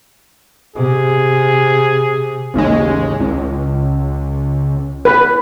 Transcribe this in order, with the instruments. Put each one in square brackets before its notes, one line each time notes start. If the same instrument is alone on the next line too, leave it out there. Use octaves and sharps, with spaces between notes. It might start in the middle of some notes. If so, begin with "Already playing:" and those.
[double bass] C3 [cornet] G#4
[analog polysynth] A1 D#2 C#3 G#3
C#2
[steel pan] B4